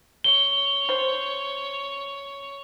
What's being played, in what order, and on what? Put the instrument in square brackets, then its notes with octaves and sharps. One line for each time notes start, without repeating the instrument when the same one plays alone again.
[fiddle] C#5 [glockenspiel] G7
[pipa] C5